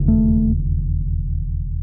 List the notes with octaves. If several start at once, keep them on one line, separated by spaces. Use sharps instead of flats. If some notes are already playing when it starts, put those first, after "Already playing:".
Already playing: E1 D#2 C#3
A3